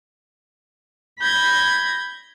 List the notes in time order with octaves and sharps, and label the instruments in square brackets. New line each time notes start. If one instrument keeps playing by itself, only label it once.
[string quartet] B5 G6 G#6 A#6